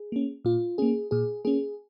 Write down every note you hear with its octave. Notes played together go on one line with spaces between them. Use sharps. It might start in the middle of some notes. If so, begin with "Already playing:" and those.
Already playing: G#4
A#3 C#4
A#2 F4
A#3 C#4 G#4
A#2 G#4
A#3 C#4 G#4